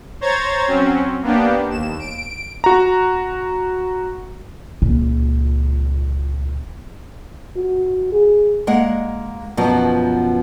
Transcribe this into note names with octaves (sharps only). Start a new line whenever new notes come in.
C5 C#5 A#5 G#6 A6
F#3 C4 C#4
A#3 B3 D4 G4
D#2 E7
D7
F#4 A#5
C#2 A#2
F#4
G#4
G#3 A#3 F#5
F#2 B2 F3 F#3 B3